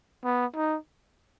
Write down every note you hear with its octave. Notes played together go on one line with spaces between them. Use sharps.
B3
D#4